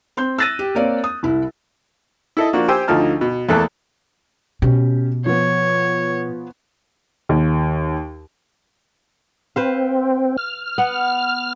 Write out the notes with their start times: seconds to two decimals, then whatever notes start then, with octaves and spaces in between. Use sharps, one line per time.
0.17 C4 C6 G6
0.38 E6 F#6 A6 A#6 D#7
0.59 G4
0.75 A#3 C4 A#4 C#5 D5 F5
1.04 D#6
1.23 C2 E4
2.37 E4 A4 D#5
2.53 F3 A#3 D4 F#4
2.68 G4 C5 G5 G#5 E6
2.88 D2 D3 F3 D#4 A5 F6
3.21 B2
3.49 E2 E3 A3 A#3 A4 F#6
4.62 B2 C#4 G4
5.26 F3 B3 C#5
7.29 D#2
9.56 C4 B4 C5 F5
10.38 F6
10.78 B3 F#5